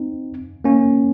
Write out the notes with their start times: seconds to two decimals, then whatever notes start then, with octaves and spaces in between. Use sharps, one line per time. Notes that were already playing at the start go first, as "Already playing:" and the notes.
Already playing: C4 D#4
0.64 A#3 C#4